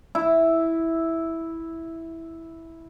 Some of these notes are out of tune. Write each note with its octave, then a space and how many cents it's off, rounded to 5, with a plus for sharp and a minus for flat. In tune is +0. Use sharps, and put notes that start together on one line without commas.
E4 -5